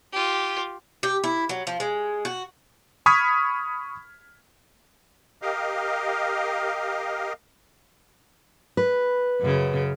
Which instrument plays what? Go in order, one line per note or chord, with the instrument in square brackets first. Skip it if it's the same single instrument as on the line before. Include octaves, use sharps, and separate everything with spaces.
[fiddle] F4 G4
[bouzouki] G4
E4
F#3
F3
G#3
F#4
[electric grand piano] B5 C#6 D#6 F6 G#6 B6
[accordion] G4 A#4 D#5 F5
[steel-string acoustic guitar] B4
[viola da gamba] F#2 C#3